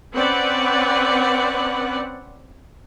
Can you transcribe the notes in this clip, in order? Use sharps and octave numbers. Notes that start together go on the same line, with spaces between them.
C4 C#4 B4 D5 F#5